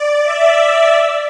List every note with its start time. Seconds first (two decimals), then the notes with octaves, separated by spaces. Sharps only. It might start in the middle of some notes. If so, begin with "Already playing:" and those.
Already playing: D5
0.23 E5
0.87 D5